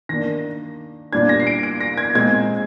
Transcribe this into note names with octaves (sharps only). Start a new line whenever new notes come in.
D#3 A#3 D4 A#6
A#2 G3 D4 G#6
A#6
C7
D7
D7
A#6
G#6
A#2 G#3 C4 D#4 G#6